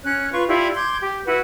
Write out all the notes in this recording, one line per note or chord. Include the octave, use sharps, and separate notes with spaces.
C#4 C#5 F#6
F4 B4 C#6
E4 F4 G4 D5
C6 D6 G6 G#6
G4
E4 F#4 B4